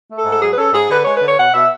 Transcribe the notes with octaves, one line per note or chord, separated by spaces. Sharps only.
A3
A4
G#2
A4
F#3 G#4
B4
C#4 A4
G#2 G#4
D3 B4
G#3 C#5
B4
D3 C#5
B2 F#5
B2 E5